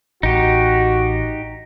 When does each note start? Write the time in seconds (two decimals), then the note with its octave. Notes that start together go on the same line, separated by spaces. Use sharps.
0.23 A1 D#4 F#4 G4